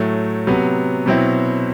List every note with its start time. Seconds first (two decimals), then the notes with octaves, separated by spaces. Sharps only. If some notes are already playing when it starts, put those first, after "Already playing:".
Already playing: A2 F#3 A3
0.47 C3 F#3 B3
1.06 B2 F#3 C4 E4